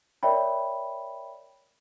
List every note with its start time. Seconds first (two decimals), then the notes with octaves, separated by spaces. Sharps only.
0.23 A#4 C#5 D5 E5 G5 B5